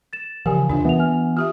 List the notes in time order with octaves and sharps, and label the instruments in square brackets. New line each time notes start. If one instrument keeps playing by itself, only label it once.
[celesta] A6 E7
[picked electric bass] C#3 F3 [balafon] E3 G4 [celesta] A#4 G#5
[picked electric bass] D#2 C3 [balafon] D4 F4
[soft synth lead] E3 [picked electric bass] B3 [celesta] E5 F7
[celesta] E5 G#5 F6
[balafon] F4 G4 E5 [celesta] D#6 F6